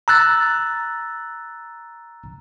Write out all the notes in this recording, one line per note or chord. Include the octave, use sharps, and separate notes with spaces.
A#5 E6 F#6 A6